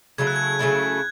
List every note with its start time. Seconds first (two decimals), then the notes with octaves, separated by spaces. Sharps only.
0.18 C#3 F#3 A3 E4 G#6
0.27 F#6
0.36 G#6
0.59 C#3 F#3 A3 E4